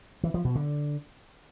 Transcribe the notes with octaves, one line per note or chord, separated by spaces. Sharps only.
E3
F3
B2
D3